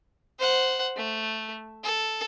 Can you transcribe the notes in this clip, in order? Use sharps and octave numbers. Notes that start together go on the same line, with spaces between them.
C5 F#5
A3
A4